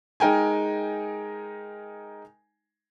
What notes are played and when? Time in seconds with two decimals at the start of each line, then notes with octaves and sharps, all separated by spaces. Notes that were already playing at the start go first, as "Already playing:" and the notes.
0.20 G#3 D#4 A#4 G5 G#5